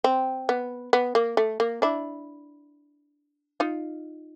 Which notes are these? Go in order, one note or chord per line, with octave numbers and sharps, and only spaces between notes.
C4
B3
B3
A#3
A3
A#3
D4 E4
D#4 F4